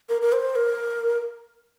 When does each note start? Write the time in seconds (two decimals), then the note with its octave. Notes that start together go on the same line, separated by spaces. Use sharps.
0.09 A#4
0.21 A#4
0.33 C5
0.56 A#4